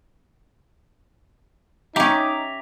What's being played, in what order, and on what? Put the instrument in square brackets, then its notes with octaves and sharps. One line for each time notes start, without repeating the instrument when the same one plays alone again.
[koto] C#4 G4 [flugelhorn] D#4 [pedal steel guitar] E5 A#5 D6